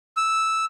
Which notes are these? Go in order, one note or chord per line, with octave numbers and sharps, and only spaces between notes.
E6